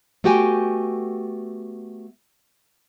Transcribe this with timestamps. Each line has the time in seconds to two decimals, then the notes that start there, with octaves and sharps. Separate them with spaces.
0.24 A3 B3 F#4 G4 G5 G#5